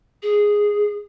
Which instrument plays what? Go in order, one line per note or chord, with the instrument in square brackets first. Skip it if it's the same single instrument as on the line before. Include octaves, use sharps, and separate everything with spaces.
[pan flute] G#4